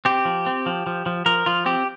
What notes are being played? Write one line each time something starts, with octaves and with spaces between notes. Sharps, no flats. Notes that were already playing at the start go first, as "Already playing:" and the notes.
C4 G4
F3
C4
F3
F3
F3
F3 A#4
F3 F4
C4 G4